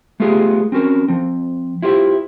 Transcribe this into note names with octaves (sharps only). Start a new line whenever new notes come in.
G#3 A3 B3 F4 G4 G#4
C4 C#4 F#4 A#4
F3 C4
E4 F4 G4 C5 E5